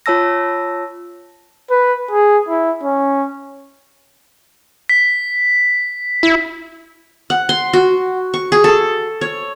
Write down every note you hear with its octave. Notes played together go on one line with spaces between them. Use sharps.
F4 C#5 A5 E6 A#6
B4
G#4
E4
C#4
B6
E4
F#5
C6
F#4
C#6
G#4
A4
C#5